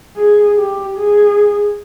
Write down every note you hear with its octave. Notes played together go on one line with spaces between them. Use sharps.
G#4
G4
G#4